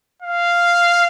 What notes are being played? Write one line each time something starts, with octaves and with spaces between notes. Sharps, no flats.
F5